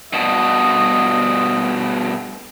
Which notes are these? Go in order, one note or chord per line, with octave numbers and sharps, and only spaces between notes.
G2 B2 D#5